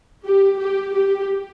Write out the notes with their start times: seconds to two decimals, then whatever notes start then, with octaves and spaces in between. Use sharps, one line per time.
0.24 G4
0.59 G4
0.93 G4